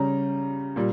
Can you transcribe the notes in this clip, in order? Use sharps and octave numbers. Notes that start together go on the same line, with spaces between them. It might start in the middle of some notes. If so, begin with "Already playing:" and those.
Already playing: C#3 G3 C#4 A#5
A#2 G3